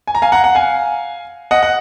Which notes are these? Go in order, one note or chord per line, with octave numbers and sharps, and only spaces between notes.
G#5
A#5
F5 G#5
F#5 A#5
F#5
F5 G#5
D#5 F#5
F#5